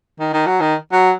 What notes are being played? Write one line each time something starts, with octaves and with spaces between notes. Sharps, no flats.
D#3
D#3
F#3
D#3
F#3